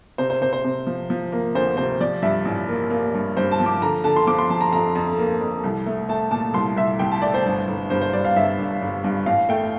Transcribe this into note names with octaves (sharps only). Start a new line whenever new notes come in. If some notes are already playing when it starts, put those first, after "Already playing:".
C3 C5
C5
C3 C5
C5
C3
F3
F3
A#3
D2 C5
C3 C5
F3 D5
G2 E5
A1
A#3
A#3
G2
G2 C5
A5
F3
D6
D3 A#5
D3 A5
C6
F3 D6
C6
F3 A5
A#5
F2 A#5
F2
A#3
F2
C2
A3
A3 A5
A#2 A5
C2 C6
C2 E5
C2 G5
A5
A3 D5
C5
G1
G1
G2 C5
C5
G2 D5
F5
G1 E5
G1
G1
G2
A1 F5
A3 G5